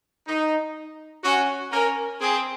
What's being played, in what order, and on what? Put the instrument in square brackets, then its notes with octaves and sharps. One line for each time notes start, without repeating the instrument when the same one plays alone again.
[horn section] D#4
[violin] C#4 [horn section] F#4
[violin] C#4 [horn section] A#4
[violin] C4 [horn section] G#4